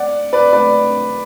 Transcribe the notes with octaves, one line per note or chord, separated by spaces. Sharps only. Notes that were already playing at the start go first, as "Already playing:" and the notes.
Already playing: D5 F#5
B4 D5
B4 D5